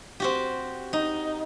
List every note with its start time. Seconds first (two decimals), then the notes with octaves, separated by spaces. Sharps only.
0.20 C4 F#4 G4
0.93 D#4